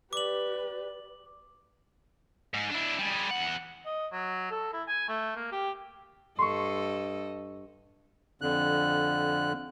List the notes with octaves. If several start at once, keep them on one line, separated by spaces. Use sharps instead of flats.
G4 B4 D5 D6 F#7
G#2
D4 E4
G3 G#4
E2 F#5
D#5
F#3
A4
E4
G#5
A3
A#3
G4
G2 A4 D#5 C6 C#6
F2 D3 F#6